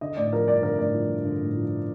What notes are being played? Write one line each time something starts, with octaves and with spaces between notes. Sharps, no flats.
D3 D#5
A1 D5
F3 A#4
G2 D5
D3 A#4
A1 D5
F3
G2
D3
A1
F3